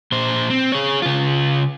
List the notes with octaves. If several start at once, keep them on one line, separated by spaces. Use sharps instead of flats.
A#2 C5
C4
G#4 C#5
C#3 F4